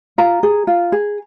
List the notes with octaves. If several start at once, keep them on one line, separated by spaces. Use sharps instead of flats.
F4 A#5
G#4
F4
G#4